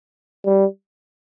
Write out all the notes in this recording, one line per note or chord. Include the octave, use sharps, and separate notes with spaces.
G3